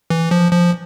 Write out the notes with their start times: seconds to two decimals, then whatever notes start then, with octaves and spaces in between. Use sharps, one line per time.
0.10 E3
0.31 F3
0.52 F3